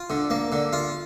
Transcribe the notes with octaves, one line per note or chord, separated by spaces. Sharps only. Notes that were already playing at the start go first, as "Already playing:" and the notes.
Already playing: F4
D3
A#3
D3
F4